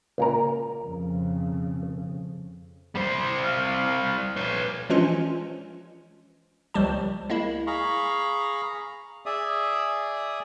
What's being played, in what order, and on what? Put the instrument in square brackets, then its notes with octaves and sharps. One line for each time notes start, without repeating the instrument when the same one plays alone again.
[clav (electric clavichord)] C#2 A#2 A#4
[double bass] F2 C#3
[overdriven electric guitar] G3 C5
[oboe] F5
[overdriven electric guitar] B4 C#5
[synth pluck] E3 F3 G#3 C#4 D4 F4
C#2 F3 G3 G4 A5
G#3 A#3 E4
[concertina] G#4 F5 A#5 B5 C#6
[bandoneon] G#4 D5 E5 D#6